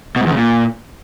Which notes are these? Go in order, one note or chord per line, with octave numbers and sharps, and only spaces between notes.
B2
G#2
E2
C#3
A#2